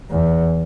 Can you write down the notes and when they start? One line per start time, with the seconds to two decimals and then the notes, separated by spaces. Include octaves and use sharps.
0.10 E2